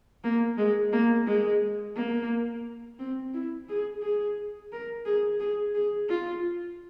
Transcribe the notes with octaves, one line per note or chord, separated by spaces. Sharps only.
A#3
G#3
A#3
G#3
A#3
C4
E4
G#4
G#4
A#4
G#4
G#4
G#4
F4